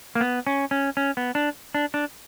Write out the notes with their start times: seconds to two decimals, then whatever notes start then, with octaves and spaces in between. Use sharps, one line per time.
0.15 A#3
0.21 B3
0.47 C#4
0.71 C#4
0.97 C#4
1.17 B3
1.35 D4
1.74 D4
1.94 D4